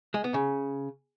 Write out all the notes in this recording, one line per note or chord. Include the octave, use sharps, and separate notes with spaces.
G#3
B3
C#3